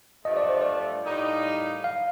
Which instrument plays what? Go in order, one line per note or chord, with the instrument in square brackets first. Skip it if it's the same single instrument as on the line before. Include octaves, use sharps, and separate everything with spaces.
[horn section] G2 F3 A3 [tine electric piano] D#5
[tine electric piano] D5
C5
D5
[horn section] A2 G3 A#3 D#4
[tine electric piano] F5